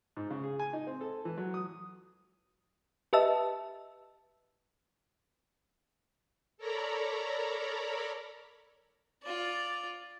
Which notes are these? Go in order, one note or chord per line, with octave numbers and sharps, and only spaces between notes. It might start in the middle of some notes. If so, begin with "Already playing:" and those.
G#2
C#3
G#4
G#5
D#4
C4
A4
E3
F#3
D#6
G4 B4 D#5 E5 A5 E6
A4 A#4 C#5 D5 A#5 B5
F4 D5